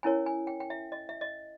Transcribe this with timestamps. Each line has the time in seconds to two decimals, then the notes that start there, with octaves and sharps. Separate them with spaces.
0.03 C#4 E4 A#4 C#5 G#5
0.26 G#5
0.47 G5
0.60 G5
0.70 E5
0.92 D#5
1.09 E5
1.21 D#5